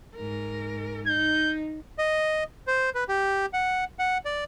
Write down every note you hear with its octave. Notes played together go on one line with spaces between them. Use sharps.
G#2 A#4
D#4 G6
D#5
C5
B4
G4
F#5
F#5
D5